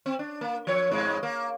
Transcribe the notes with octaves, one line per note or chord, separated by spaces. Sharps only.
C4
D4
A#3
F3 C#5
F2 G#2 G#3
A#3